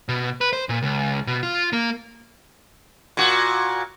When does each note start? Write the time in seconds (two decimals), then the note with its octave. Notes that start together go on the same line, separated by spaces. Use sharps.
0.09 B2
0.41 B4
0.53 C5
0.69 A#2
0.82 C#2
1.27 B2
1.43 F4
1.73 A#3
3.17 A#2 F#4